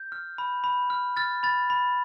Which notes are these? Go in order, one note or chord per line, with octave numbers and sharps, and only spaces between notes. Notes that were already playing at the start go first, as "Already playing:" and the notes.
Already playing: G6
F6
B5
B5
F6
F6 A6
B5 A6
B5